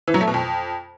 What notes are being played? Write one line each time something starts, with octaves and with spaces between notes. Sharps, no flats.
E3
F#3
A3
B2
F2